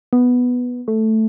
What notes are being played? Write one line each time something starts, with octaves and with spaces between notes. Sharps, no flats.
B3
A3